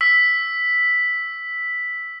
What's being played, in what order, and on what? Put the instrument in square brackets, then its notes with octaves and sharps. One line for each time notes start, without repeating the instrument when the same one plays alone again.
[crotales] E6 B6